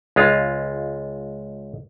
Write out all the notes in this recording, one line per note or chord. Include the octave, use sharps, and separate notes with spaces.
C#2 G#3 F4